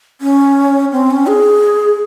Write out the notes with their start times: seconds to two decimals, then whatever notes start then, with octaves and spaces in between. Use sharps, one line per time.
0.21 C#4
0.92 C4
1.10 C#4
1.27 G#4